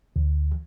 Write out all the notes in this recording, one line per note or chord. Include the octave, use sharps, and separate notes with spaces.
D2